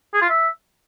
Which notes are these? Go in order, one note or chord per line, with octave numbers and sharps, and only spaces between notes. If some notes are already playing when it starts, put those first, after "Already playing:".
G#4
F4
E5